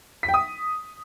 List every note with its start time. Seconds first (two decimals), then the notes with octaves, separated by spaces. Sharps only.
0.23 B6
0.28 G5
0.34 D#6